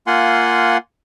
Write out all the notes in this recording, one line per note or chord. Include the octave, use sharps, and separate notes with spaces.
A#3 F4 F#5 G#5 C6